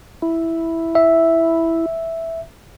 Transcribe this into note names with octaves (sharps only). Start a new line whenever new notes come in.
E4
E5